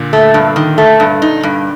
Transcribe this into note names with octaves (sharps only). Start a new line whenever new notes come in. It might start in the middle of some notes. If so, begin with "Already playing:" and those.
Already playing: A#2 D3
A3
G2
D#3
A3
G2
D#4
G2